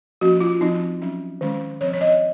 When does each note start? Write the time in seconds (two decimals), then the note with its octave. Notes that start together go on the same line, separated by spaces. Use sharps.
0.21 F3 A#3 C#4 F#4
0.41 F4
0.61 F3 C4 D#4
1.01 F#3 C#4
1.41 D#3 G#3 C#4
1.81 F3 C4 C#5
1.93 C#5
2.01 D#5